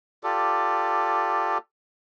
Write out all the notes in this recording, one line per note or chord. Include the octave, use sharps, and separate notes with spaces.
F4 G4 A4 D5